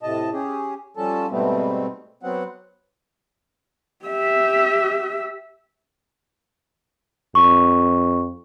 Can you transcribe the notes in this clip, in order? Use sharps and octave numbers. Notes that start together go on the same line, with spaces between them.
A2 C3 D#5 A5
C#4 G4 G#4
F3 G3 C#4 A4 A5
G#2 B2 G3 A3 B3 C4
F#3 B3 C4 F#5
G4 E5
F2 C#6